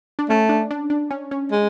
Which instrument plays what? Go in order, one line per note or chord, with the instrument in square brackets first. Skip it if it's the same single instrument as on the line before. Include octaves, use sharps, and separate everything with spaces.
[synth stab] D4
[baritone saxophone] A3 [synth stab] C#4
[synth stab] D4
D4
D4
C#4
C#4
[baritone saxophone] G#3